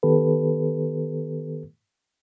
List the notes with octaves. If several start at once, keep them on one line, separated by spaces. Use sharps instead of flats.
D#3 B3 G4 A4 B4